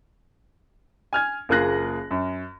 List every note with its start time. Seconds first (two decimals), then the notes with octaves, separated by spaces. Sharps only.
1.13 G#5 F6 G#6
1.49 F#1 A#3 F4 G#4 F#6 A#6
2.11 F#2